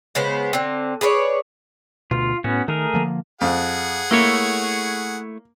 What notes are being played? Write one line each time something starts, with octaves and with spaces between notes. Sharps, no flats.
C#3 G#3 B3 C5
D3 C4
G#4 B4 C#5 D5
D2 B2 F4
A2 B3 C#4 F#4
D#3 A3 G#4 A#4
D3 F3 A#3
F2 G#4 F#5
A3 A#3 E4 C#5